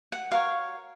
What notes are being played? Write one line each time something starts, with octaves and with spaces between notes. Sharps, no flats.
F#5
F#4 A#4 C#5 F5